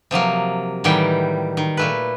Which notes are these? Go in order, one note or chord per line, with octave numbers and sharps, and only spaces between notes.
C3 F3 F#3 A#3
A2 D#3 E3 F#3 G3 G5
D#3
A#2 A3 B4